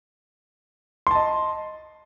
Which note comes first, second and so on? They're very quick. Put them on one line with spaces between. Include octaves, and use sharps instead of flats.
C6 A5 D#5